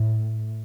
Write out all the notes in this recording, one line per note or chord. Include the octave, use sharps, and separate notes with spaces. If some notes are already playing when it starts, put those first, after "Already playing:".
Already playing: A2